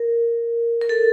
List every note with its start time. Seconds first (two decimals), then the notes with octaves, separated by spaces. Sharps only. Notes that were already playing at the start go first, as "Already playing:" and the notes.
Already playing: A#4
0.81 A#4
0.89 A4